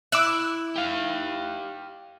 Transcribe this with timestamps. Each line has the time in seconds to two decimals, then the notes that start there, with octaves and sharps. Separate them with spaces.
0.12 E4 D6 E6 F#6
0.76 G4 F5